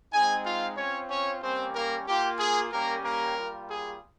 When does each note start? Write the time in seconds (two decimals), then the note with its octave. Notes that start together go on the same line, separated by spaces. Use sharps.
0.12 G#3 C4 D#4 G#4 G#5
0.45 F4 F5
0.77 C4 C#4 F4 C#5
1.10 C#4 C#5
1.42 G3 A#3 C4 C#4 G4 C5
1.75 A#3 A#4
2.07 A#3 F4 G4
2.39 G#4
2.72 G3 A#3 C#4 G4 A#4
3.04 A#3 A#4
3.36 G3 A#3 F4
3.69 G#4